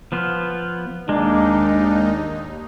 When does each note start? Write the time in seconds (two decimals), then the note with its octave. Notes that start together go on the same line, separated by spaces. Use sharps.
0.12 F3 B3 F4
1.09 D#2 G#3 A#3 D4 D#4